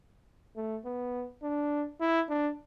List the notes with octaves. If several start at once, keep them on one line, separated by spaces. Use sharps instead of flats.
A3
B3
D4
E4
D4